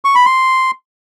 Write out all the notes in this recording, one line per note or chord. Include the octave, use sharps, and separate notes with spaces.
C#6
B5
C6